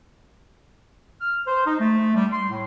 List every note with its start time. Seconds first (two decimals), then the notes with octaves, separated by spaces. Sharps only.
1.21 F6
1.46 C5
1.67 D#4
1.80 A3
2.15 G3
2.32 C6
2.49 A2